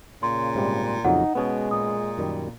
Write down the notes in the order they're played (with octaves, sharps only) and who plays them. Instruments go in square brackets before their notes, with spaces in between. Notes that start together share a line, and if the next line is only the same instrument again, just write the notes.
[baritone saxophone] A#2 [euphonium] C#3 [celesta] C6
[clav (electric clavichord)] G#2 C3 G3
[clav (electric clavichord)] F2 C#3 F#3 [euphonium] D#4 [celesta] F#5
[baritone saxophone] B2 [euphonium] G#3 [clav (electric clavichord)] B3 C#4 G#4
[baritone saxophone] A#2 [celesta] D#6
[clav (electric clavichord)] F#2 D#3 G3